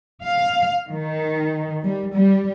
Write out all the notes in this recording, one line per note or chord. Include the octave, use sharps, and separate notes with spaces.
F5
D#3
G3
G3